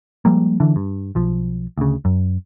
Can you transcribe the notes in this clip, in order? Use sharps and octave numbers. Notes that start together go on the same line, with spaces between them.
F3 G3 G#3 A#3
D3 E3 D4
G2
B1 F3
D2 C#3
F#2